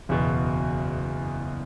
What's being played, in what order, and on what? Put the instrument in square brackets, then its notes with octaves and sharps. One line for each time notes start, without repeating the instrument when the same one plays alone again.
[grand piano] F#1 E2 B2